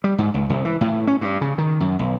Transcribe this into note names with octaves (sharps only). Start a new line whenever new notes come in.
G3
G#2
C#2
C2
E3
A2
C#4
G2
C#3
D#3
F#2
B1